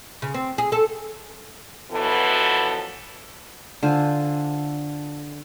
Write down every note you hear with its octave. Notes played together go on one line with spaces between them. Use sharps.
C#3
C4
G#4
A4
F#2 B2 E3 F3 B3 A4
D3 F4 C5 G#5